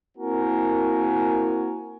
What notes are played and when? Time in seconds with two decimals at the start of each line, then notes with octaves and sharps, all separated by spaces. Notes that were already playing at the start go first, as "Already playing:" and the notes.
0.18 A#3 C4 E4 F#4 A#4 G#5